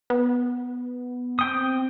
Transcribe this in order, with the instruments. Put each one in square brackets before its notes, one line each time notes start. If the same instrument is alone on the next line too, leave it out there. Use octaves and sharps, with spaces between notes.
[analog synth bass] B3
[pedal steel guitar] C4 G5 D#6